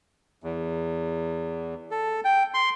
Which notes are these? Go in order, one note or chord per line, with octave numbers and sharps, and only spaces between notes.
E2
A4
G5
C6